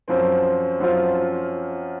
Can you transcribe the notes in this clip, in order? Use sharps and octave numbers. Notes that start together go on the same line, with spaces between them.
F#2 F3 C4
F#2 F3 C4 F4